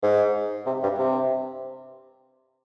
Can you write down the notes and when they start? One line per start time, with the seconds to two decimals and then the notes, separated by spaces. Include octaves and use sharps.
0.03 G#2
0.66 C3
0.83 G2
0.98 C3